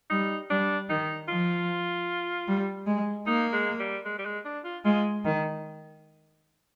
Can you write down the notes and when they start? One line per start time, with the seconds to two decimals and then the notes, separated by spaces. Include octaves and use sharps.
0.10 G3 D#4
0.50 G3 D4
0.89 D#3 D#4
1.29 F3 F4
2.47 G3
2.86 G#3
3.27 A#3 D#4
3.53 G#3
3.80 G3
4.05 G#3
4.19 G3
4.25 G#3
4.45 D4
4.64 F4
4.85 G#3 F4
5.24 D#3